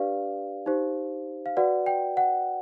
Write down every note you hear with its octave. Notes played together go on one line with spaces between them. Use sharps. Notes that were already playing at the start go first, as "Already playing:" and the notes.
Already playing: D4 G4 B4 D5 F5
D#4 G4 C5
F5
F#4 B4 D5 F#5
G5
F#5